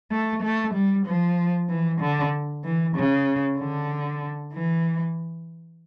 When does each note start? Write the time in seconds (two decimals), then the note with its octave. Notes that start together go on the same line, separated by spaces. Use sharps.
0.11 A3
0.43 A3
0.74 G3
1.06 F3
1.69 E3
2.00 D3
2.64 E3
2.96 C#3
3.58 D3
4.53 E3